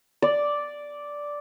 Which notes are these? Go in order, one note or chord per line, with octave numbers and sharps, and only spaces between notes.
D5